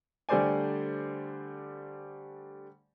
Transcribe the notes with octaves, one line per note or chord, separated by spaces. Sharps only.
D3 G3 A3 C5 D5 G#5